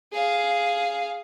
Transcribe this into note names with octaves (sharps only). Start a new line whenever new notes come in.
G#4 F5